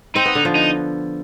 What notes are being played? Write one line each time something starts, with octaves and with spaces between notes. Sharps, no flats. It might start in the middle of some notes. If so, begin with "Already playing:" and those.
C4 D#4
B3
D3
F3
D#4